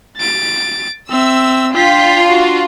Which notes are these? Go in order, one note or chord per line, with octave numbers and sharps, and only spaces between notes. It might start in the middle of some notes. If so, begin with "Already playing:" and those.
A6 D7
C4 E5 E6
D4 F4 G5 B6
F#4